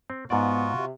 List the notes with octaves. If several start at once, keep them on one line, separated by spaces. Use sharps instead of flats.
C4
G#2 B3 F4 F#4 D5
C3